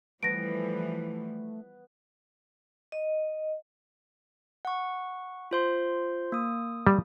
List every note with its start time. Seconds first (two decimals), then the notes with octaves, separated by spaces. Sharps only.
0.23 E3 F3 G3 A3 B3 B4 A#6 D7
2.92 D#5
4.65 F#5 C#6
5.51 F4 C5 C6
6.32 A#3 D#6
6.87 G3